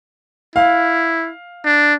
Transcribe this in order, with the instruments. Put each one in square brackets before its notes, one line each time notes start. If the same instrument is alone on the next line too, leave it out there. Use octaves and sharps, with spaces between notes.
[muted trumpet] E4 [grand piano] F5
[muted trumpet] D4